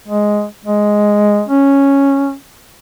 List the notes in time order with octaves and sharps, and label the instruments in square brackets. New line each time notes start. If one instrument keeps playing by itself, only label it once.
[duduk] G#3
G#3
C#4